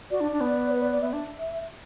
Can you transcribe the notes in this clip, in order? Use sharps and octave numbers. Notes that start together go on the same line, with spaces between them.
F#4 D5
D4
D4
B3
B4
D5
D5
B3 E5
D4